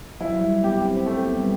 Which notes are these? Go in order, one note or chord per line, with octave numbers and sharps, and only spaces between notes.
F#3 E4
G3
B3 G4
C4
A3 C4
B3
G3